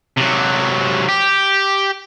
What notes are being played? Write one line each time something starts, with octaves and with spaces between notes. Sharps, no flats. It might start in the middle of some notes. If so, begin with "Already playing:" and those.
C3 F#3
G4